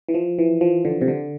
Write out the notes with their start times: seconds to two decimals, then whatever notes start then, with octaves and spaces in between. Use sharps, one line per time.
0.09 E3
0.14 F3
0.38 E3
0.61 F3
0.85 D3
1.01 C3
1.08 D3